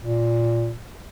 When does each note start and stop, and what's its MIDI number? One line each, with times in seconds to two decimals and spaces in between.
0.02 0.73 46